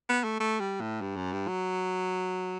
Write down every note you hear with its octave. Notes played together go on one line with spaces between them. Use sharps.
B3
A3
A3
G3
A2
G2
F#2
G2
F#3